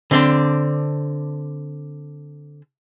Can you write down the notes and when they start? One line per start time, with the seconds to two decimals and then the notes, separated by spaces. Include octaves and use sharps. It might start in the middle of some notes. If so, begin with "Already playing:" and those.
0.11 D3 C4 D4